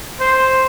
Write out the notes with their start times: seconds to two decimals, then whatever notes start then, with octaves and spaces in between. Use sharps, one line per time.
0.20 C5